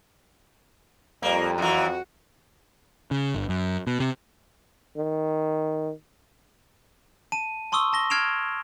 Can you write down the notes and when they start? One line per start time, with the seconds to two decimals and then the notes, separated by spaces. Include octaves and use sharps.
1.23 F2 G3 A#3
1.58 F#2 E3 F#4
3.11 C#3
3.35 G1
3.49 F#2
3.87 B2
4.00 C3
4.97 D#3
7.32 A5 D#7
7.72 A5 C6 C#6 D#6 E6 G7
7.93 A5 A#6 G7
8.10 F6 G#6 C7 D7 E7 F7